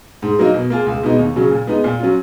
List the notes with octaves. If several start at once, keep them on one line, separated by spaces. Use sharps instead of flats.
G#2
F#3 A#3 D#4
B2
A#3 F4 G#4
C#2
B2 G#3 B3 D#4
D#2
C#3 F#3 C#4
A#2
G#3 B3 D#4
A#2
F#3 C#4 F4